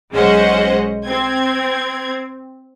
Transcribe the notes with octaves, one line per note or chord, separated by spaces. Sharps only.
B1 G#3 C#4 C5 D#5 F#5
C4 G#6